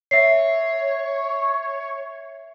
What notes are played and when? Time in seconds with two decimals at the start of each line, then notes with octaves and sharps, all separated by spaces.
0.11 C#5 E5 C7